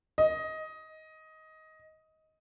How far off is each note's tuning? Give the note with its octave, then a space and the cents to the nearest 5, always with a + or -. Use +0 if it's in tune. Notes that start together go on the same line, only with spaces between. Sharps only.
D#5 +15